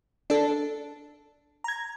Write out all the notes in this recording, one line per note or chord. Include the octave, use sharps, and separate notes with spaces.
D4 A4
A#5 G#6